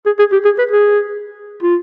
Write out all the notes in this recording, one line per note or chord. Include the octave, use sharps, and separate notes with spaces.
G#4
G#4
G4
G#4
B4
G#4
F4